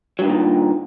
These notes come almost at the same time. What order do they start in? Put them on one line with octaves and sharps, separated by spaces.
F#3 G2 D#3 A#2